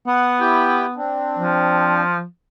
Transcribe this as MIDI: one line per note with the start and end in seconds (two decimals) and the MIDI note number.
0.07 0.99 59
0.07 0.39 78
0.40 0.85 64
0.40 0.85 67
0.40 0.85 79
0.96 2.02 60
0.96 2.02 62
1.39 2.23 53